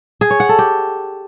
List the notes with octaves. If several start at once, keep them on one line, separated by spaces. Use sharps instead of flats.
G#4
C#5
F#5
A4
G4